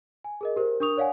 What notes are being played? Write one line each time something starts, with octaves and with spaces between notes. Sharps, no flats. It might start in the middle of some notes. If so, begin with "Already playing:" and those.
G#5
G#4 A#4 D#5
G4 A#4 C5
D4 A#4 C#6 D#6 F7
C#5 D5 F5 F#5 G#5